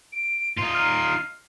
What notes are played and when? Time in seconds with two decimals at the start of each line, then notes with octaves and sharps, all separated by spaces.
0.12 D7
0.57 D#4 F4 C7
0.75 F6